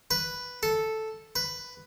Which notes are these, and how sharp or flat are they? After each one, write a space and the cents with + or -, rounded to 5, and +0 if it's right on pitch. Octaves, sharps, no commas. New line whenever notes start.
B4 +0
A4 -5
B4 +5